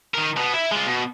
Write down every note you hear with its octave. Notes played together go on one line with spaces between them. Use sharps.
D#3 A#4
B2 B3
E4 E5
G#3 F4
B2